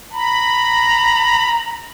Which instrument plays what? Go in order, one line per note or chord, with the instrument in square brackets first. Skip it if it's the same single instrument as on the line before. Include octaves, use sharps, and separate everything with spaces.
[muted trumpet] A#5 [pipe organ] B5